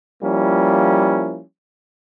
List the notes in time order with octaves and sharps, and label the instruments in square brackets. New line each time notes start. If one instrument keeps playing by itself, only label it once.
[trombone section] F3 G3 A#3 C#4 E4